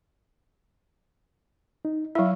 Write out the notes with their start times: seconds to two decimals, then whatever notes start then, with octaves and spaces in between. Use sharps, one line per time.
1.85 D#4
2.15 F#3 E4 E5 F5